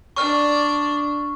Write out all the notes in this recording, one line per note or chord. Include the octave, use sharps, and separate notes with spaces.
D4 D5 C#6 F6